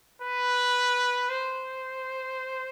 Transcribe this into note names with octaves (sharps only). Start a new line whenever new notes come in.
B4
C5